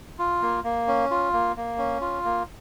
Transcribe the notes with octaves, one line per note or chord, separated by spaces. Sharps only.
F4
A#3
A#3
C#4
F4
A#3
A#3
C#4
F4
A#3